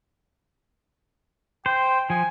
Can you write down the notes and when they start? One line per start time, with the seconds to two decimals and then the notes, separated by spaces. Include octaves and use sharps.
1.66 C5 G5
2.10 F3 G#5